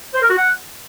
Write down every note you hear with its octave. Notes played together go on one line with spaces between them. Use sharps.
C5
A#4
F#4
F#5